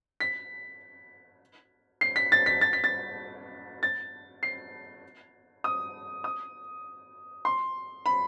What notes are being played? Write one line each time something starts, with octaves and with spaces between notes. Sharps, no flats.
B6
C7
B6
A6
B6
A6
B6
A6
A6
C7
D#6
D#6
C6
B5